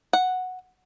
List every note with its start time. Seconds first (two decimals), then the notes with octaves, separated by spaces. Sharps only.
0.13 F#5